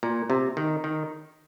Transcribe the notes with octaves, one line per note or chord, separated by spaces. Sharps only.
A#2
C3
D#3
D#3